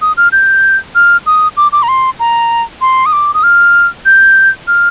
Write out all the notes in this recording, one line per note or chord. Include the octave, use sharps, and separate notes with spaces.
D#6
F6
G6
F6
D#6
D6
D6
A#5
C6
A#5
C6
D#6
D6
D#6
F6
G6
F6